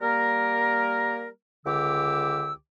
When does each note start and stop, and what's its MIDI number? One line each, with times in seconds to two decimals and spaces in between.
0.01 1.27 55
0.01 1.27 58
0.01 1.27 70
1.66 2.52 37
1.66 2.52 50
1.66 2.52 67
1.66 2.52 86
1.66 2.52 88